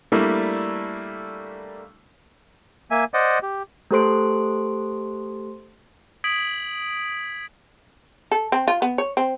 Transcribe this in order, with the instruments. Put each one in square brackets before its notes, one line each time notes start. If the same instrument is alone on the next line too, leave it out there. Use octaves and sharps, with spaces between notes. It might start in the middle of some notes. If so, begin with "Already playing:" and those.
[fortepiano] G3 A3 A#3 D4 E4
[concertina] A#3 E5 G#5
C5 D5 D#5 F#5
G4
[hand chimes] A3 G4 A4 C5 C6 D7
[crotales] D#6 G#6 B6 D7 F#7
[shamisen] A4
C4
F4
B3
C#5
C4